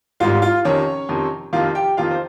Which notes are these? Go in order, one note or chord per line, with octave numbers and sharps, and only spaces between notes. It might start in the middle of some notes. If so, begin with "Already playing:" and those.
G#1 G#2 G3 F4 F5
F4 F5
F2 C3 D#3 C#4 C#5
F2 C3 D#3
F2 C3 D#3 F4 F5
G4 G5
F2 C3 D#3 F4 F5
C5